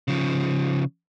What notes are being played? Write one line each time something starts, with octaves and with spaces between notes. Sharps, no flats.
C#3 F3